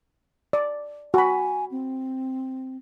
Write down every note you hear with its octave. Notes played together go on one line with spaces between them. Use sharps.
D5
F#4 G#5 B5
C4